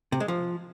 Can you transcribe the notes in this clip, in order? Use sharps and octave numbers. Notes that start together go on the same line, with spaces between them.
C3
G#3
F3